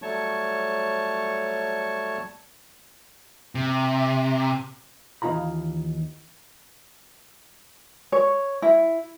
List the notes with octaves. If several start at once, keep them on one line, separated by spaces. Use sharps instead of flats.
F#3 G3 A3 C#5 A5 C#6
C3
D#2 E3 D#4 F4 A#5 B5
C#5
E4